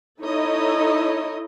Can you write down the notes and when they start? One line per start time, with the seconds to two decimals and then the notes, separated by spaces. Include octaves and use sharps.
0.19 D#4 E4 A4 C#5 D#5